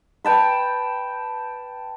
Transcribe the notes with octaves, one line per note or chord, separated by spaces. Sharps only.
B4 G5 A5 B5